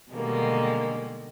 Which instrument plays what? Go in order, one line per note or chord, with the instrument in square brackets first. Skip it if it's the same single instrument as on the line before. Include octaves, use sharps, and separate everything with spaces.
[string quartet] B2 D3 D#3 G3 G#3 A#3